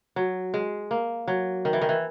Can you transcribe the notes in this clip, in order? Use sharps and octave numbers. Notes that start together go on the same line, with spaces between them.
F#3
G#3
A#3
F#3
D#3
E3
D#3
E3